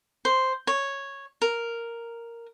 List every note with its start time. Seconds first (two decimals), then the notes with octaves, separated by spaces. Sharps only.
0.25 C5
0.67 C#5
1.42 A#4